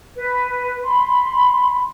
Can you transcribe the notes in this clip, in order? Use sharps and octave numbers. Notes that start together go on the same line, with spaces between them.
B4
B5 C6